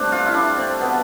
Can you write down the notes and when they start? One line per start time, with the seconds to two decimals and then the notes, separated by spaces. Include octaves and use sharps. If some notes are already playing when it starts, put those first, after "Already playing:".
Already playing: G2 A3 C4 D4
0.12 F4
0.26 E4
0.34 D4
0.57 C4
0.80 B2 B3